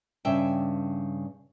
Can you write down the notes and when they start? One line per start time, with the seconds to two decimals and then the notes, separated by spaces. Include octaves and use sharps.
0.25 G2 C#3 E5 G5